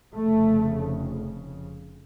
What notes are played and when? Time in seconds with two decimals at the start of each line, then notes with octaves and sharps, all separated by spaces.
0.15 F1 F2 C#3 A3